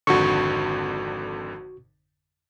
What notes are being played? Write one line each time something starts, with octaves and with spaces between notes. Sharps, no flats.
G#1 F2 D3 F#4 C#6